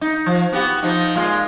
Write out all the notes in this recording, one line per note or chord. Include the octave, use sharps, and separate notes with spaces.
D#4
F3
B3 F#4 G4
F3 D#4
A#2 G#3 F4